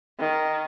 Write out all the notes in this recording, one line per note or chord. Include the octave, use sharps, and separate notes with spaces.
D#3